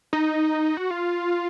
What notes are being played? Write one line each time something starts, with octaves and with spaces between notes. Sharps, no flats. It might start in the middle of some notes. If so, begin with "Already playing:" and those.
D#4
F#4
F4